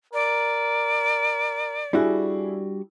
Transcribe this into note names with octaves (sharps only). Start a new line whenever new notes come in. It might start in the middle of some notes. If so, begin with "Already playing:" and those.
A#4 D5
G3 D4 E4 F#4 G#4